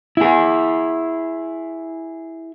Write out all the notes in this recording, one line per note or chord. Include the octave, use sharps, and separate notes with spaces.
E4 G#4